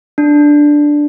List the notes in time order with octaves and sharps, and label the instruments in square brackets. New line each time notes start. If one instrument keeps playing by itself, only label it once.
[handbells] D4